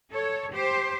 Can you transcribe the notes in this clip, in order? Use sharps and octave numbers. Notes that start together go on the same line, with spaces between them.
A4 C#5
G4 C5